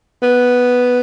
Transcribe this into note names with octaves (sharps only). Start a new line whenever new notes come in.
B3